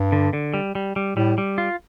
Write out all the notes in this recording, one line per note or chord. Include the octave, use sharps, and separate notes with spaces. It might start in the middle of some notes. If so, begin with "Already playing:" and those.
Already playing: G2
D3
D3
G3
G3
G3
A2 G3
G3
F4